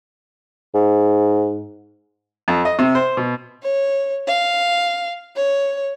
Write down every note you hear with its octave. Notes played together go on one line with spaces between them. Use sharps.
G#2
F2
D#5
C3
C5
B2
C#5
F5
C#5